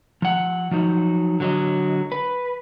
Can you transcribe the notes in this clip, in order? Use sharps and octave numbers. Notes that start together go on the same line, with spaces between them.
F3 F#5
F3 F#3 D#4
D3 F#3 D#5
B4